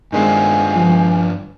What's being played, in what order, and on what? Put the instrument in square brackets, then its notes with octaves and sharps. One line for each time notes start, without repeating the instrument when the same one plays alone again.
[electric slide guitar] G2 D4 F4 [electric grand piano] D#3 G#3 C4 [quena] G#5
[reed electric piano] F3